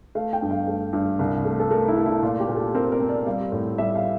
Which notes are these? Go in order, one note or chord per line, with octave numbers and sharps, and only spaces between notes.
A3 F5
G5
G2
F5
A3
G2
C2
A3
A4
A3 A#4
E4
A3
E4
A#2 F4
G4
A#2
A4
C4 A#4
A#4
C4
D5
G3 F5
A2
G3 E5
F5